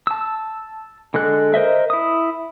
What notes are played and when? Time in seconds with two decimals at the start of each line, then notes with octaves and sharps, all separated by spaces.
0.07 A5 E6
1.14 D3 G#3 A4 F#6
1.54 A#4 C5 D#5 E5
1.90 E4 D#6